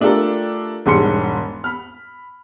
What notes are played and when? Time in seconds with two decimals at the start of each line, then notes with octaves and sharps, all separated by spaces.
0.01 A3 D4 F4 G4 A4 A#4
0.86 E1 G#2 G3 C6 C#7
1.64 B5 F6